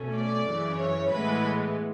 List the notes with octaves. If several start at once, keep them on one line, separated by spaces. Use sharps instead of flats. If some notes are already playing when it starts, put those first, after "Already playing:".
Already playing: B2 A3 C#4
D5
F#2 C#3 E3
C#5
A2 E3 G#3 B3 B4